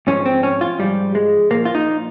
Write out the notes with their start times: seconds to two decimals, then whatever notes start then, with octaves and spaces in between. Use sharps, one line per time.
0.07 G#2 F3 C#4
0.26 C4
0.43 C#4
0.61 F4
0.79 G#2 F3 G3
1.15 G#3
1.51 A#2 F3 A#3
1.65 F4
1.75 D#4